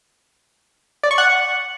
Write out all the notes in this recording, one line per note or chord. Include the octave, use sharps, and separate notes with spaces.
D5
C#6
F#5